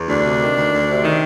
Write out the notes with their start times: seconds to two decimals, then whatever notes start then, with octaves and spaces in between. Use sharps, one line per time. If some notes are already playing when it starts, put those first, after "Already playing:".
Already playing: E2
0.08 D2 D4
0.24 C3
0.40 D#3
0.56 D2
0.72 D2
0.88 C3
1.04 D#3